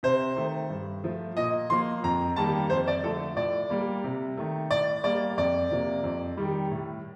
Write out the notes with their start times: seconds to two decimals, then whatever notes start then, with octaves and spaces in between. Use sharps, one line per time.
0.03 C3 C5
0.36 D#3 A3
0.70 G2
1.04 F3 A3
1.37 A#2 D#5
1.70 F3 A#3 C6
2.03 F2 A#5
2.36 D#3 G3 A#3 A5
2.70 F2 C5
2.88 D5
3.04 D3 F3 A3 A4
3.36 A2 D5
3.70 G3 A#3
4.04 C3
4.37 D#3 A3
4.71 A2 D5
5.04 G3 A#3 D5
5.37 F2 D5
5.71 C3 F3 A#3
6.03 F2
6.37 D#3 G3
6.71 A2